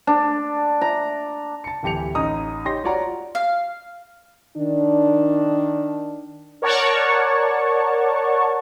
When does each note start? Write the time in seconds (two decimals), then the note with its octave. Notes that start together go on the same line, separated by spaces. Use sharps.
0.07 D4
0.81 A#5
1.64 A5 C#7
1.83 D1 E3 G4 C#7 F7
2.15 A1 D#4 A#5 D#6
2.65 D#4 G4 C#5 C6 A#6
2.84 F4 F#4 C#5 D5 F#5 A#5
3.35 F5
4.57 D#3 D4
6.62 A#4 C#5 D5 F#5 A5 C#6